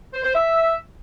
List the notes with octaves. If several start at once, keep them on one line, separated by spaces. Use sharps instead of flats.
C5
C5
E5